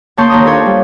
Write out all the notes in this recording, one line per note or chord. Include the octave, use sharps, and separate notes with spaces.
C#3 A#3 A5 C6 C#6 G6
D#2 A#5 D#6
D4 F4 A4 C5 C#5
G3